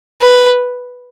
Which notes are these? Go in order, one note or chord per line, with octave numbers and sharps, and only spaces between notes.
B4